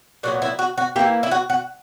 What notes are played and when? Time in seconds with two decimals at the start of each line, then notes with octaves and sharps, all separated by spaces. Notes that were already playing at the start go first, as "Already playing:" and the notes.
0.23 A#2 F#3 B3 F#4
0.42 E4
0.59 F#4
0.78 F#4
0.96 E3 A#3 E4 G4
1.23 E4
1.31 F#4
1.50 F#4